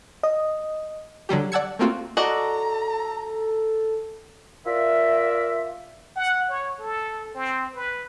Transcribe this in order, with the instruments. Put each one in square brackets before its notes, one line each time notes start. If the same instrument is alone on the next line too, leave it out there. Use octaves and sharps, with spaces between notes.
[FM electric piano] D#5
[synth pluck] D3 F#3 G3 G4
D5 F#5 A5 E6 G#6 C#7
A3 A#3 C4 F4 F#4
[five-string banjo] F#4 D5 D#5 [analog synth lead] A4 [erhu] A#5
[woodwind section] F4 A#4 D5 E5
[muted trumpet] F#5
C#5
A4
C4
B4